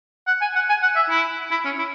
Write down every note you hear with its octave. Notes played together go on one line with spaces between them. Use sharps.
F#5
G#5
F#5
G#5
F#5
E5
E4
E4
C#4
E4